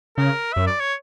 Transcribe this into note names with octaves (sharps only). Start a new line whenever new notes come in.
C#3 A#4
F#2 E5
D5
C#5